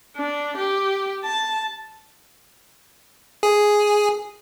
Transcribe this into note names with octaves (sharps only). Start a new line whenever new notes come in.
D4
G4
A5
G#4